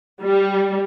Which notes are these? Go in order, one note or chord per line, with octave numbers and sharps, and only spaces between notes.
G3